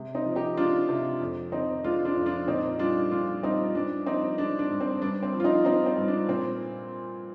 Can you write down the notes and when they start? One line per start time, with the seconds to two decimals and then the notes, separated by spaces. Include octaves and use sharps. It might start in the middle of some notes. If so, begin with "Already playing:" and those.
Already playing: C3 G#3
0.15 C4 D#4
0.26 F3
0.36 D#4 G4
0.57 G#3 D4 F4
0.89 C3
1.21 F2
1.52 D#3 C4 D#4
1.84 G#3 D4 F4
2.05 D4 F4
2.16 F2
2.26 D4 F4
2.48 A#2 C4 D#4
2.79 G3 D4 F4
3.11 A#2 D4 F4
3.43 G3 C4 D#4
3.75 G2 D4
4.06 F3 C4 D#4
4.38 G#3 D4
4.59 D4
4.70 G2
4.81 C4
5.02 G2 D4
5.23 C4
5.34 F3
5.40 F4
5.44 C4 D#4
5.65 G#3 C4 D#4
5.86 C4
5.97 G2
6.08 D4
6.28 A#2 C4